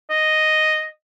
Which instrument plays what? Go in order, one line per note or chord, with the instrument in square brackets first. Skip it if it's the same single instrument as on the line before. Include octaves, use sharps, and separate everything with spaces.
[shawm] D#5